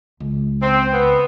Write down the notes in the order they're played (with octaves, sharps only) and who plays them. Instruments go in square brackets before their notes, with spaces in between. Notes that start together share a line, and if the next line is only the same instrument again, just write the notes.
[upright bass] C#2
[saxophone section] C4
B3